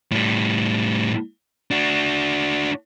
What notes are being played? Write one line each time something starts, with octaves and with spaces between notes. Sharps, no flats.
A2 G3
D4 F#4